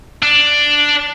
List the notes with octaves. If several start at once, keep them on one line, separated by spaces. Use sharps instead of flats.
D4